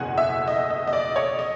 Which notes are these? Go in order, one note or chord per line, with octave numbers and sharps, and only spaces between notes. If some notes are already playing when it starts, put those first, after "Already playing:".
Already playing: F#1 E2 B2 F#5 G#5
E5
D#5
D#5
D#5
D5
C#5
D#5